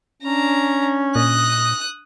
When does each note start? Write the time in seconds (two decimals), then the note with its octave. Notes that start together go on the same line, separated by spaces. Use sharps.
0.22 C#4 D4 A#5
1.15 A#2 D#5 D#6 F#6